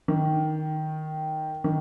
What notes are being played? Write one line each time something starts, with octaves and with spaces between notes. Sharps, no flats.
D#3
D#3